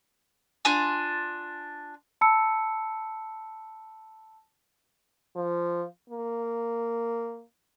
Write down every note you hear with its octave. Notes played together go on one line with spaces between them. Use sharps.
D4 F4 G#5
A5 B5 E6 C#7
F3
A#3